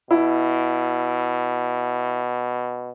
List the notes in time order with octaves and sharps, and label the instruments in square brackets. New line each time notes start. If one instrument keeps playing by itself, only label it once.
[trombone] B2 [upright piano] E4